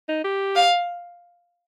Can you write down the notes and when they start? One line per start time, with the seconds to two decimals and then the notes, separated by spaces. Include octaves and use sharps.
0.08 D#4
0.24 G4
0.56 F5